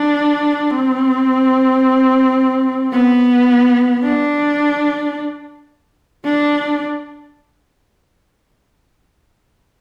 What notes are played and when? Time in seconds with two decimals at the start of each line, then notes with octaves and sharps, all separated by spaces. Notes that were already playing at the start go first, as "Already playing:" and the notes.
Already playing: D4
0.71 C4
2.92 B3
4.03 D4
6.25 D4